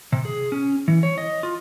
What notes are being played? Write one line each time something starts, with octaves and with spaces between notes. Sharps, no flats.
C3
G#4
C#4
E3
C#5
D#5
F4